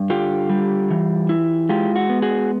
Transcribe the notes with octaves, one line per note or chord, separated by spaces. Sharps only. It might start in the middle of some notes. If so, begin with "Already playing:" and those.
Already playing: G2
D3 F4 G4
G3
E3
E4
G#3 F4 G4
F#4
B3
F#4 G#4